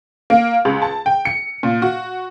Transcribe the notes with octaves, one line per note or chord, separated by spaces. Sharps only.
A#3
C#2
A5
G5
C#7
A#2
F#4